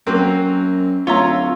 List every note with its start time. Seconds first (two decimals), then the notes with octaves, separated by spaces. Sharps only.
0.07 F#2 F#3 A#3 C4
1.07 D1 F4 C#5 E5 A#5